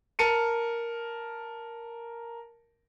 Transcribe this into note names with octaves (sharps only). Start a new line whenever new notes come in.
A#4 A5 C#7 D#7